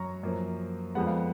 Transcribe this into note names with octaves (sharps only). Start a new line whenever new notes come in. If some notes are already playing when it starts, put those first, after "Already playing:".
Already playing: F#2 F#3 A#5 C#6
F#2 F3 A#3
F2 F3 G#3 B3 F#5
F5